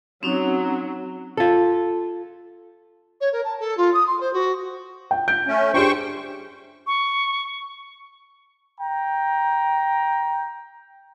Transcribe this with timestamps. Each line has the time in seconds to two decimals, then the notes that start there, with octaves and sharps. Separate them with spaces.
0.23 F#3 C4 C#4 D#4
1.37 F4 A4
3.20 C#5
3.32 A#4
3.44 A5
3.59 A4
3.77 F4
3.93 D#6
4.06 C6
4.20 C5
4.33 F#4
5.11 G5
5.28 G6 D7
5.47 A3 C#4
5.74 D4 G4 G#4 C5 G5 C#6
6.87 C#6
8.79 G5 A#5